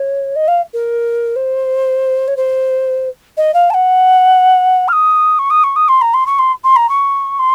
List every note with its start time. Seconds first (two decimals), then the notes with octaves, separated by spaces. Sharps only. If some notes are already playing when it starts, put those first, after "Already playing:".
Already playing: C#5
0.36 D#5
0.48 F5
0.73 A#4
1.36 C5
2.28 C#5
2.37 C5
3.37 D#5
3.54 F5
3.70 A5
3.74 F#5
4.88 F6
4.93 D#6
5.39 C#6
5.50 D#6
5.64 C#6
5.76 D#6
5.88 C6
6.01 A#5
6.14 C6
6.26 C#6
6.39 C6
6.64 C6
6.76 A#5
6.89 C#6
7.39 C6